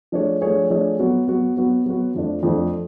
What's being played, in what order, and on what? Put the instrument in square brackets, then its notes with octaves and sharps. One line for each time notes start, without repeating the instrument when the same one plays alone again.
[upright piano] F3 A3 D4 G#4 C#5
F3 A3 D4 G#4 C#5
F3 A3 D4 G#4 C#5
F#3 B3 F#4
F#3 B3 F#4
F#3 B3 F#4
F#3 B3 F#4
F2 F3 A3 D4
F2 F3 A3 D4